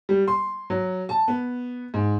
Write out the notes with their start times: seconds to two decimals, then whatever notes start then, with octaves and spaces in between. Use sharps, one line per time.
0.09 G3
0.28 C6
0.70 F#3
1.09 A5
1.28 B3
1.94 G#2